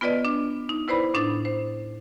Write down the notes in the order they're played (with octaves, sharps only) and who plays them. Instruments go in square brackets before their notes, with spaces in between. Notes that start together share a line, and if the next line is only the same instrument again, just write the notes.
[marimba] B3 F4 B4 D5 D#5
D4
D#4
E4 B4 C5 D5 B5
A2 D4 D#4 A6
C5